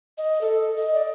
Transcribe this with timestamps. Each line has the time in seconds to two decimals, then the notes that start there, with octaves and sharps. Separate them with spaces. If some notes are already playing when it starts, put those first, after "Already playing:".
0.18 D#5
0.41 A4
0.76 D#5
0.95 D5